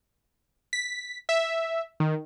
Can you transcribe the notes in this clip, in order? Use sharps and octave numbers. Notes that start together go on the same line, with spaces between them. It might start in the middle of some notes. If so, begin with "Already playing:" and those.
B6
E5
D#3